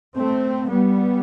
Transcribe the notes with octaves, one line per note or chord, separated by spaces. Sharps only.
A3 C4
G3 B3